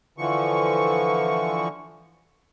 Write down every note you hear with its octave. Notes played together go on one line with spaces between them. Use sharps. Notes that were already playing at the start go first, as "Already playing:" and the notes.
D3 E3 F3 C#6